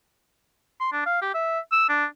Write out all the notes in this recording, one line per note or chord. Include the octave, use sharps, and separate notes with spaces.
C6
D4
F5
G4
E5
E6
D4